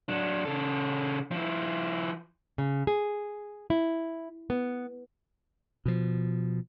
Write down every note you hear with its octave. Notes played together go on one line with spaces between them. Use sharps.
F#3 D4
C#3 A4
F3 E4
C#3
G#4
E4
B3
B2 F3